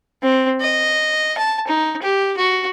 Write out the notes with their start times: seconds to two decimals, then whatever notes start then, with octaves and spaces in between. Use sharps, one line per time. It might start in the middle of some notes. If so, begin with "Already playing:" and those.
0.23 C4
0.61 D#5
1.38 A5
1.67 D#4
2.02 G4
2.37 F#4